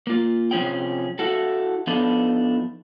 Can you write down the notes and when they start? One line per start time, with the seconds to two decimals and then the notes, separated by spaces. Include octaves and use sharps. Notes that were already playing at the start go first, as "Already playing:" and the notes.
0.07 A#3 F4
0.51 C3 F3 C4 C#4 G#4 G5
1.19 E4 F#4 A4
1.87 F3 B3 D4 D#4 A4